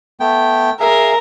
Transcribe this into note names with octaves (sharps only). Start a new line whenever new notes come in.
A3 B3 G5
G#4 A#4 E5 F5